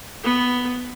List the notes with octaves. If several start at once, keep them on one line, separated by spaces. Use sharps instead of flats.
B3